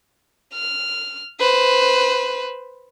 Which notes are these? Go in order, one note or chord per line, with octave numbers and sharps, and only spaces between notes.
F6
B4 C5